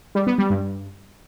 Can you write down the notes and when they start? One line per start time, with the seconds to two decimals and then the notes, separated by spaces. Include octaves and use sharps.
0.15 G3
0.27 B3
0.38 G3
0.50 G2